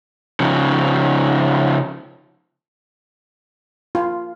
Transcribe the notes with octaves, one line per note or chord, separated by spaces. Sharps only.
C#3 F3
F4